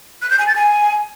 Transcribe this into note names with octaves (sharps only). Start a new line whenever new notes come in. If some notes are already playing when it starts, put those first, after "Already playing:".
F#6
G6
G#5
A6
G#5